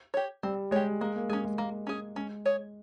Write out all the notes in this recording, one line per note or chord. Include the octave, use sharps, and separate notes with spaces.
G4 C#5
G3 C4
G#3 G4 C#5
G#3 A#3
A#3
G#3 C#4 G#4
G#3
G#3 A#3
C#4 G#4
G#3 C#4
G#4 C#5